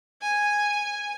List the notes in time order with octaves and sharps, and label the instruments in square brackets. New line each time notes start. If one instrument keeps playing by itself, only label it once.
[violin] G#5